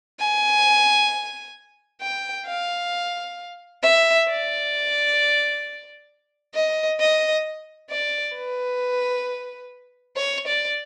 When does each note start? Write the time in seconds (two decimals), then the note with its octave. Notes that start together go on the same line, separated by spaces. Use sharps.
0.20 G#5
2.02 G5
2.47 F5
3.83 E5
4.28 D5
6.55 D#5
7.00 D#5
7.91 D5
8.36 B4
10.17 C#5
10.47 D5